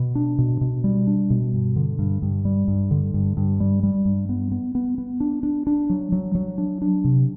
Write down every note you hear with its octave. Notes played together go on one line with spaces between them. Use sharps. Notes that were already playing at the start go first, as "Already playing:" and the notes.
Already playing: B2
D4
B2
B2
G3
D4
B2
G2
D3
G2
G2
G3
G2
D3
G2
G2
G3
G3
G2
B3
B3
B3
B3
D4
D4
D4
F#3
F#3
F#3
D4
D4
C3